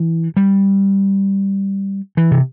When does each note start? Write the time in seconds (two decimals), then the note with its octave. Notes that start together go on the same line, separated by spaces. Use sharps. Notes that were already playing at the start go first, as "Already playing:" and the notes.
Already playing: E3
0.37 G3
2.17 E3
2.31 C3